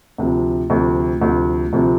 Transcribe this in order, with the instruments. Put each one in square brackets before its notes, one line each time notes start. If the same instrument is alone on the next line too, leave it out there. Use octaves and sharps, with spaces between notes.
[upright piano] D2 C3 F3
D2 C3 F3
D2 C3 F3
D2 C3 F3